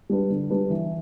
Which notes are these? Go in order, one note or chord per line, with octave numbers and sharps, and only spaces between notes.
G3 D4 B4
D3
G3 D4 B4
E3